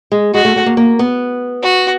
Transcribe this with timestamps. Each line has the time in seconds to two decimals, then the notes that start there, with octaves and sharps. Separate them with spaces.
0.12 G#3
0.34 G#3 F#4
0.45 A3
0.56 A3
0.66 A#3
0.77 A#3
0.99 B3
1.63 F#4